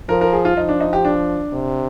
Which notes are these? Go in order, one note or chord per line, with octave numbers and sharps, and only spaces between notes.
F3 A#4
A#4
G#4
F4
F3 D#4
D4
D#4
G4
D4
C3